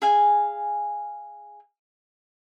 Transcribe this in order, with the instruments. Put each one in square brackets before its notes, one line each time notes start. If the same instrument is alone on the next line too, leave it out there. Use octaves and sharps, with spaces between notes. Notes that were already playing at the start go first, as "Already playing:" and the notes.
[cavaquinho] G#4 F5 G#5